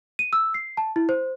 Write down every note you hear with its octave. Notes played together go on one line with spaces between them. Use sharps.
D#7
E6
C7
A5
E4
C5